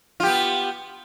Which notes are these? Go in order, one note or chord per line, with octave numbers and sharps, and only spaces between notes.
B3 F4 G4